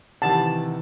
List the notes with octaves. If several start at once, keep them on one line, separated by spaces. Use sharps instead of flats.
C3 D#3 E3 F#5 A5